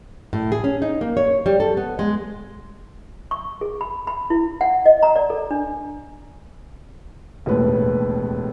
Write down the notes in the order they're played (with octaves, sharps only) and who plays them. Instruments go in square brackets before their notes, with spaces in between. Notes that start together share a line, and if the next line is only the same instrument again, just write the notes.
[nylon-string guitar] A2
G#4
C#4
D#4
A#3
C#5
G3
A4
B3
G#3
[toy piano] C#6
G#4
B5
B5
E4
F#5
D#5
A#5
D5
A4
D4
[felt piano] E1 D#2 A2 B4